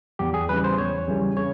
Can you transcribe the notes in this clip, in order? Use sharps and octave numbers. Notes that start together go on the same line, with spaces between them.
E2 G4
G#4
C#3 E3 G3 B4
C5
E2 C#5
C#3 E3 G3
C#3 C#5